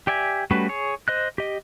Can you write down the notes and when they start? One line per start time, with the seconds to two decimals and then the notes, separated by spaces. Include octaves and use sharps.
0.07 G4 D5 E5 G#5
0.51 G3 A3 C#4 F#4 B4
0.69 G#4 C#5
1.08 C5 D#5 F#6
1.38 G4 D#5